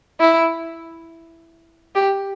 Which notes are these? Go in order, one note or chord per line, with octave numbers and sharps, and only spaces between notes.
E4
G4